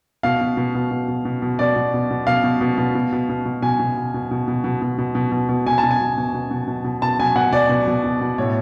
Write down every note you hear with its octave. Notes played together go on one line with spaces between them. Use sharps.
B2 F5
B2
B2
B2
B2
B2
B2
B2
B2 D5
B2
B2
B2
B2 F5
B2
B2
B2
B2
B2
B2
B2
B2 G#5
B2
B2
B2
B2
B2
B2
B2
B2
B2
B2
B2
B2 G#5
A5
B2
G#5
B2
B2
B2
B2
B2
B2
B2 A5
B2 G#5
B2 F#5
B2 D5
B2
B2
B2
B2
A2 C#5